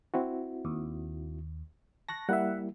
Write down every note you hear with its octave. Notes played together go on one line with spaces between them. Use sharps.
C4 E4 F#4
D#2
A5 C#6 F#6 A#6
G3 A#3 E4 E5 F#5